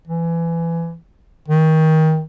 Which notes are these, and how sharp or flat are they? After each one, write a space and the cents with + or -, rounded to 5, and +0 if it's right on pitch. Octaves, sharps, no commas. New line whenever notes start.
E3 +25
D#3 +25